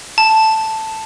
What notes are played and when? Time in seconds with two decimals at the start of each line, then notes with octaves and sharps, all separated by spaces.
0.18 A5